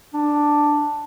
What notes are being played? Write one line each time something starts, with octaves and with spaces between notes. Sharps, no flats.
D4